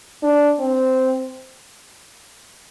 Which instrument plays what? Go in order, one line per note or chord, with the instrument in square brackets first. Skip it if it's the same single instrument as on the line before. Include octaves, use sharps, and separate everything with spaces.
[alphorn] D4
C4